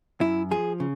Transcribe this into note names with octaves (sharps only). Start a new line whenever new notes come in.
F#2 E4
F3 G#4
C#3